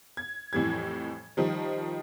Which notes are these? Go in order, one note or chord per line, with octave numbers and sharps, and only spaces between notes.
G#6
F2 A2 E3 G3 G#6
D#3 F3 G3